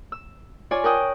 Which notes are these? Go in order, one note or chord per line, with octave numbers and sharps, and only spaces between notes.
E6
F4 C#5 D5 G#5
A#4 F#5 G5 D#6